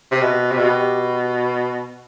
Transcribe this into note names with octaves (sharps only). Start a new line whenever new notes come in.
C3
B2
C3
B2 G4